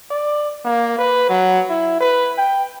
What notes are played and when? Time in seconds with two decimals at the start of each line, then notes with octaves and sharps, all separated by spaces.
0.10 D5
0.65 A#3
0.98 B4
1.29 F#3
1.69 E4
2.01 B4
2.38 G5